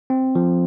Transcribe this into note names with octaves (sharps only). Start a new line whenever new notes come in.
C4
F3